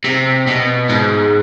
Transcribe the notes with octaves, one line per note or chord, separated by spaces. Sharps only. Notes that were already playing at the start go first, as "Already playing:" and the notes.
C3
B2
G#2